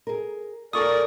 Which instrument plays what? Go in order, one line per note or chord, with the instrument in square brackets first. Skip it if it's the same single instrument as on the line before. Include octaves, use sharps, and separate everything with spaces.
[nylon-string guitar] G#4 A#4
[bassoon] A#2 [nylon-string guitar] A4 G#5 [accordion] A#4 D5 [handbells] C#6 D#6